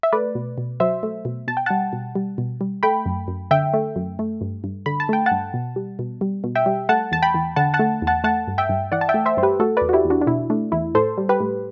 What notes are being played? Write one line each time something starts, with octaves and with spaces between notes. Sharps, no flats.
E5
A3 B4 D5
B2
B2
F#3 C5 E5
A3
B2
B2 A5
G5
G3 F#5 A5
B2
G3
B2
G3
A3 G5 B5
F#2
F#2
D3 E5 G5
A3
F#2
A3
G2
G2
D3 B5
A5
A3 G5
F#5 A5
G2
B2
G3
B2
G3
B2
E5 G5
G3
A3 F#5 A5
E2 A5
G5 B5
E2
D3 F#5 A5
F#5 A5
A3
E2
F#5 A5
A3 F#5 A5
G2
E5 G5
G2
E3 D5 F#5
A5
E5 G5
A3
C5 E5
G2 C5
G4 B4
A3 F#4 A4
E2 B4 D5
F#4
E4 G4
E2
D4 F#4
D4
B2 E4
A3 D4
E2 E4
A2 A4 C5
G3
G4 B4
A2